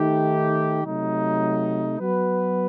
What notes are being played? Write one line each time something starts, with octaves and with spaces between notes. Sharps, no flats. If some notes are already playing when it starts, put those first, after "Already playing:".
Already playing: D#3 A3 D#4 G4
C3 F#3 A3 D#4
F#3 B3 F#4 B4